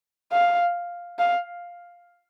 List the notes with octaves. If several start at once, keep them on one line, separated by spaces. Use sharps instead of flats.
F5
F5